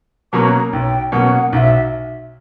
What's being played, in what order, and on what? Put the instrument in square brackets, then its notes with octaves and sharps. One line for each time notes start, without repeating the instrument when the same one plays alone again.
[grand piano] B2 F#3 A#3 C#4 [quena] A#5 D6
[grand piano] B1 [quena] G5
[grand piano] B2 F#3 A#3 C#4 [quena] F#5
[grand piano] B1 [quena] F#5
[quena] E5